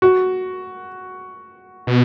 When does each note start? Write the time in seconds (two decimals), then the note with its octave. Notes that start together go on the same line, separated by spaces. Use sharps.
0.02 F#4
1.87 B2